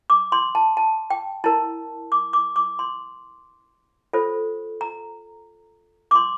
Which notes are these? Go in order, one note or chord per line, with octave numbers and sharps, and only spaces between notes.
D6
C6
A5
A5
G5
E4 A#4 A5
D6
D6
D6
C6
F4 A4 C5
A#5
D6
C6